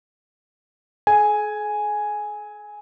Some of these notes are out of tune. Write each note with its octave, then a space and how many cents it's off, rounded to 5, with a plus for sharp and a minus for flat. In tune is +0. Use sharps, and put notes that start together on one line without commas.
G#4 +45 G#5 +0